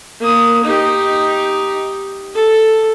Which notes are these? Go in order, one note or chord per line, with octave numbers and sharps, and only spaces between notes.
A#3 D#6
D#4 G4
A4